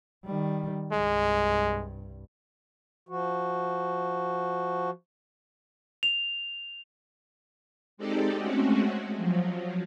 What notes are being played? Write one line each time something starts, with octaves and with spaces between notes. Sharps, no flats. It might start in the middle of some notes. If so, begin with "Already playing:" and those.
D#3 G3
C2 G2 G#3
F3 F#4
F7
G#3 C4 D#4 G4 A4 D5
G#3 A3 C4 C#4 F#4
F3 F#3